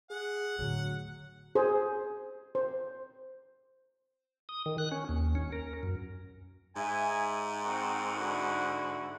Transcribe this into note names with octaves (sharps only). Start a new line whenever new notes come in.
G#4 F#5
A2 D3 F#3
G#4 C5
C5
D#6
D#3
F#6
C#4
D#2
C#4
A#4
F#2
G#2 E5 G#5
C4 F#4 A#4
D3 E4 F#4